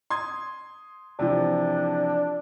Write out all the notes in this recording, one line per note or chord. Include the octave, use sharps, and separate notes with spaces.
C6 D#6 G#6
C3 E3 F3 D4